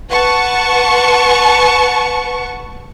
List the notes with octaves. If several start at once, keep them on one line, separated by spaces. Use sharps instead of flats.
B4 F#5 A5 C#6